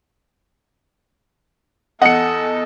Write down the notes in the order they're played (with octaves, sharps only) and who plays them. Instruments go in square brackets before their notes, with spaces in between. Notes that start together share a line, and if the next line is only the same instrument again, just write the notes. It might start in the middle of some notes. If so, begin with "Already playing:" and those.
[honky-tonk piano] E2 D#5 [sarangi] A4 [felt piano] F#5 C#7